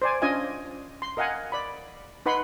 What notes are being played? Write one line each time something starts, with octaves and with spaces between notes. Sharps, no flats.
C5 D5 G#5
C#4 D4 F4 D#5 G#5
C6
A#4 D#5 F5 F#5 G#5
D5 B5
D#4 B4 F#5 B5 C6